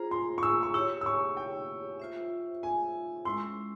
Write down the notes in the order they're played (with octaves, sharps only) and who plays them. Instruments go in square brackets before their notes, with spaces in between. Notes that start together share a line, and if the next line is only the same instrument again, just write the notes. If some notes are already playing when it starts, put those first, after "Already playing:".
Already playing: [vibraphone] F4 G#4 C5 [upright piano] A#5
[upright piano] C6
C#6
E6
C#6
[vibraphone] E4 G4 C#5 [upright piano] E6
[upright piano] E6
C#6
G5
[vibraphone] F4 C5 E5
[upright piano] G#5
[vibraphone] G#3 C#4 E4 [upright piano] C6